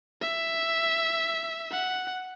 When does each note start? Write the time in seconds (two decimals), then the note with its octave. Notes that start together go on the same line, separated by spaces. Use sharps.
0.21 E5
1.71 F#5